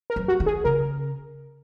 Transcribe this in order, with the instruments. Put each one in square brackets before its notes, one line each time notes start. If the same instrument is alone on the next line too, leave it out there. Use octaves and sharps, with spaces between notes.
[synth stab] A#4
[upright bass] F#2
[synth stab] F#4
[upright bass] D#3
[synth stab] G#4
[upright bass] C#3 [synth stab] A#4